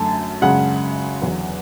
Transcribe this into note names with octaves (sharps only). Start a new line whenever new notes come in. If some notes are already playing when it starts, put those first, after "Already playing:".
Already playing: F#2 D3 A3 A5
F#2 C#3 G#3 F#5
E2 D3 F#3